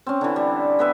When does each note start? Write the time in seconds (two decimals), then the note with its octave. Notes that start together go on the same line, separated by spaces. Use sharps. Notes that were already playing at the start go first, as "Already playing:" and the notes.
0.06 C4 C#4
0.21 D3 E3
0.36 G3
0.79 B3 B4 E5